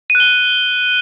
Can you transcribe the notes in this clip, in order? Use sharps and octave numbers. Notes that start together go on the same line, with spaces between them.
D#7
F#6
G7